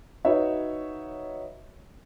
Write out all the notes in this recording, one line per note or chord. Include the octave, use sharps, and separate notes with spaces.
D#4 F#4 B4 C#5 E5